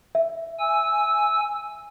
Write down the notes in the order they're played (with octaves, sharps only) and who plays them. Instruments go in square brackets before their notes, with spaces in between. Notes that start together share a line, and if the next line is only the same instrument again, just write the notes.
[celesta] E5
[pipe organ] G#5 E6